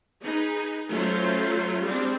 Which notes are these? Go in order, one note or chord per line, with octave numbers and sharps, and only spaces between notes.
D#4 G#4 B4
F#3 A3 C#4 F4 A4 C5
G3 G#3 C4 D4